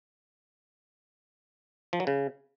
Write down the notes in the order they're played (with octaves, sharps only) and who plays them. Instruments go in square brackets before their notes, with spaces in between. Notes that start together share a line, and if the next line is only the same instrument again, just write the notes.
[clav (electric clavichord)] F3
F#3
C#3